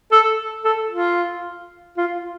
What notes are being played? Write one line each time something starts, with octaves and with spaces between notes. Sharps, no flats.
A4
A4
F4
F4